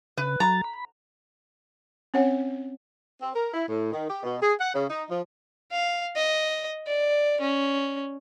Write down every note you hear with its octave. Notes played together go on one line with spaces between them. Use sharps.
C#3 B4
F#3 A#5 A6
B5
C4 C#4 C#5 F#5
C4
A#4
E4
A2
D#3
G4
B2
G#4
F#5
C#3
D#4
F3
F5
D#5
D5
C#4